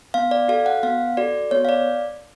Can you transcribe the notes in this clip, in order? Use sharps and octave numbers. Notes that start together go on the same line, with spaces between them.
B3 F5
D5
F#4 A4 F5
F#5
B3 F5
F#4 A4 D5
B3 C#5
F5
D5